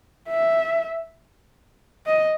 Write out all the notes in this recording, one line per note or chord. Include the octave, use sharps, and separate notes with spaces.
E5
D#5